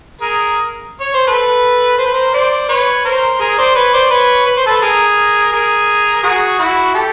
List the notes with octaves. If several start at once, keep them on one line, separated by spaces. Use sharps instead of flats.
G#4 A#4
C#5
C5
A4 B4
C5
B4
A#4 C5
C5 D5
B4 C#5
A#4 C5
G#4 A#4
C5 D5
B4 C#5
C5 D5
B4 C#5
B4
C5
A4 B4
G#4 A#4
G#4 A#4
F#4 G#4
E4 F#4
G4 A4